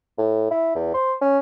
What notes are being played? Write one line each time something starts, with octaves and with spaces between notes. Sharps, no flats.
A2
E4
E2
C5
C#4